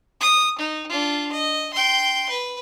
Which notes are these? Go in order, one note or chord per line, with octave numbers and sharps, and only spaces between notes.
D#6
D#4
D4 F4
D#5
G5 C6
B4